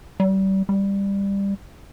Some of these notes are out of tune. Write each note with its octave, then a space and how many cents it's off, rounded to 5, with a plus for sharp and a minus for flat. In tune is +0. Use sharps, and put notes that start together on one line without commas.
G3 -30
G3 +15